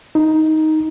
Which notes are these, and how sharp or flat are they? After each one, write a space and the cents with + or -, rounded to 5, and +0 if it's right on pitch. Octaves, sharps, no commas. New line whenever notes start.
D#4 +10